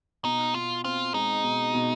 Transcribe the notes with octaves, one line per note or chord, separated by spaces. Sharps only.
B2 D#4
B2 F4
C4 F4
G#3 D#4
B2
B2